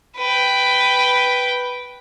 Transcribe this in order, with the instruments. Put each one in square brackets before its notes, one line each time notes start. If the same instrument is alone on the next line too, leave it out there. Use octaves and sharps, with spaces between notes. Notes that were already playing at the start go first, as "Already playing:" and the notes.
[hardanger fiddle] B4 G5